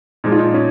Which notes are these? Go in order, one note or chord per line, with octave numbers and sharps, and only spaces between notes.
A#2 F3 G#3 D#4
F4
D#4
C#4